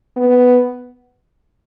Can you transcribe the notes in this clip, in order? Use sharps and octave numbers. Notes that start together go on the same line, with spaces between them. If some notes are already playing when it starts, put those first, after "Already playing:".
B3